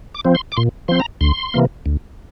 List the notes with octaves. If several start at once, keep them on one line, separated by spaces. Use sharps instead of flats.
D6
F3 C4
C6
D6
A#2 C6
F3 C4 C6
A#5
D2 C6
C3 E3 A#3
D2